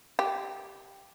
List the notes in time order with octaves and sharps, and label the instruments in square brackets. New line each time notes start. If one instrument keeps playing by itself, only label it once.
[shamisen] G4